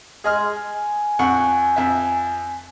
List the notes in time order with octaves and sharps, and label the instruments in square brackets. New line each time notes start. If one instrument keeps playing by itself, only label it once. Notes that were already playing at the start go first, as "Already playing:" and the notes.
[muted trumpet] G#3 [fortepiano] G#4 D#5 F6
[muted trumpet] G#5
[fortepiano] F2 F#5 C#6
F2 E5